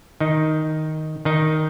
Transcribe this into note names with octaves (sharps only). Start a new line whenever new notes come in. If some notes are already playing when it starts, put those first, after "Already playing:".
D#3 D#4
D#3 D#4